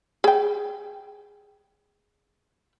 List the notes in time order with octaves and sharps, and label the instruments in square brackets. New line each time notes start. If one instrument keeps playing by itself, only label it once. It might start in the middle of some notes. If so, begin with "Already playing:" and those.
[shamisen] G#4 G5